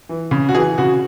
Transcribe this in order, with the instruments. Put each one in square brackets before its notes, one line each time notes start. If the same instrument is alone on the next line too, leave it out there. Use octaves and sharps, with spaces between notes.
[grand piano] E3
C#3
F#4
E3 G#4
C#3 F#4